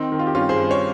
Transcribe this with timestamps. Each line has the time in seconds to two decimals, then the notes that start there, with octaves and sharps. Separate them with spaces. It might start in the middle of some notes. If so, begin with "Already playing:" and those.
Already playing: D#3 C4 D#4
0.12 D#3
0.19 F4
0.27 G4
0.35 G2 C#4 F4
0.49 G#4 C5
0.56 G2
0.71 C#5